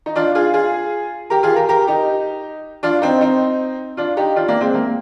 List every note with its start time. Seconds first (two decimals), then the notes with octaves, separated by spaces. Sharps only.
0.06 D#4
0.16 D4 F4
0.35 F4 G#4
0.54 F4 G#4
1.30 G4 A#4
1.43 F4 G#4
1.56 G4 A#4
1.69 G4 A#4
1.87 D#4 G4
2.83 D4 F4
3.02 C4 D#4
3.21 C4 D#4
3.97 D4 F4
4.17 D#4 G4
4.36 D4 F4
4.48 A#3 D4
4.61 G#3 C4
4.74 A#3